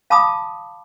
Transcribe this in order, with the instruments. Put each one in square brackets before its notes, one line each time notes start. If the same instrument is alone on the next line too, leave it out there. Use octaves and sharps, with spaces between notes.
[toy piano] F5 A5 B5 D6 D#6